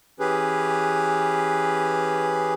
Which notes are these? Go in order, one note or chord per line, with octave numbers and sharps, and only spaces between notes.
E3 C#4 G4 G#4 B4